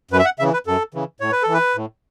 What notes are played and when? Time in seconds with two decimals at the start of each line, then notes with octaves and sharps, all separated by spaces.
0.11 F#2 B4
0.19 E5
0.25 F#5
0.39 C#3 E3 E5
0.53 B4
0.67 F#2 A4
0.94 C#3 E3
1.20 A2 C#5
1.32 B4
1.43 A4
1.48 E3
1.53 B4
1.76 A2